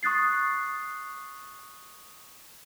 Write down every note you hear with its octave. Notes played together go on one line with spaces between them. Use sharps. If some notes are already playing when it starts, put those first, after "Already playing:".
C#6 D#6 F#6 A6 C7